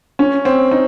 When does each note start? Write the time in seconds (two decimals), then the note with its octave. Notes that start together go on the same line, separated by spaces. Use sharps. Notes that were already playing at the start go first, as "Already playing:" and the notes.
0.19 C#4
0.45 C4
0.71 D#4